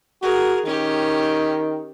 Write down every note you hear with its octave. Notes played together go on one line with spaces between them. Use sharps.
F#4 G#4 A#4
D#3 C#4 G4